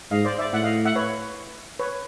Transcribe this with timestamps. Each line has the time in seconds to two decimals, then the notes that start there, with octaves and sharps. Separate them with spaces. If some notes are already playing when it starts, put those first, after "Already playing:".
0.11 G#2 D#5 F5
0.25 C5 D5
0.39 D5 E5
0.53 A2 E5 F#5
0.64 D#5 F5
0.85 E5 F#5
0.96 B4 C#5
1.79 B4 C#5